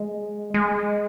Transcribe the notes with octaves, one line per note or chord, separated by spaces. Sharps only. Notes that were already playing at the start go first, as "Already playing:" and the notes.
Already playing: G#3
G#3